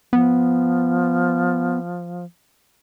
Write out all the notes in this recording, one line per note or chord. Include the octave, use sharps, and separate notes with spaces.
F3 B3